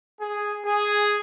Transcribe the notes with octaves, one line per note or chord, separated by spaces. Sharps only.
G#4
G#4